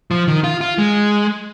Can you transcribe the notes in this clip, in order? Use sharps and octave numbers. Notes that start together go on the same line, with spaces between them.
F3
D#3
F4
F4
G#3